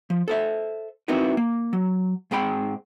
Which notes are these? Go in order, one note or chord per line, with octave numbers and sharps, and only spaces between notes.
F3
A4 C5 E5
C4 D#4 E4 F#4 A#4 B4
A#3
F#3
G#2 C4 G#4 G5 B5